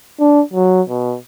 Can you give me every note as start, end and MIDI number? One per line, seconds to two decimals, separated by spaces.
0.20 0.42 62
0.53 0.82 54
0.89 1.16 47